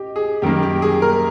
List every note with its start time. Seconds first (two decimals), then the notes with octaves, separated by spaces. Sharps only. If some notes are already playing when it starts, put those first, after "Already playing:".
Already playing: G4 D#5
0.16 G#4
0.42 F#2 D#3 G3 A#3 G4
0.63 G4
0.82 G#4
1.02 A#4